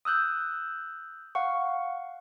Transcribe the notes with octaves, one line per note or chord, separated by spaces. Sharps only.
D#6 E6 F#6 G6
F5 F#5 C#6